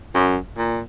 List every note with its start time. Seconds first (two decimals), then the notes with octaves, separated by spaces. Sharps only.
0.14 F#2
0.57 A#2